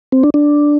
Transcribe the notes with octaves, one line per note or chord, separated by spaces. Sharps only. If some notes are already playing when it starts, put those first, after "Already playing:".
C4
D4
D4